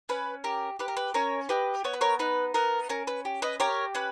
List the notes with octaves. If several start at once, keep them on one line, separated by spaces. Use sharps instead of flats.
C#4 B4
G4 A#4
G4 B4
A#4
B4
C#4 A#4 C#5
G4 B4 D#5
B3 C#5
B4
A#4 C#5
D#4 B4
B3 A#4
C#4 A#4
B4
G4
B4 D#5
G4 A#4 C#5
C#4 B4